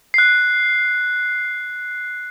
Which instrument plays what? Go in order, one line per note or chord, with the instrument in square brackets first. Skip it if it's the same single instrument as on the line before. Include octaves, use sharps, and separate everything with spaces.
[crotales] F#6 C7